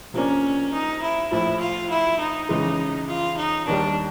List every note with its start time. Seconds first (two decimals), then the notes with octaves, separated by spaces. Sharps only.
0.14 C3 F3 A#3 C#4 D4
0.73 D#4
1.02 E4
1.31 A#1 A2 F3 E4
1.61 F4
1.91 E4
2.20 D#4
2.49 F2 C#3 E3 G#3
3.08 F4
3.37 D#4
3.67 D#2 D#3 G3 D4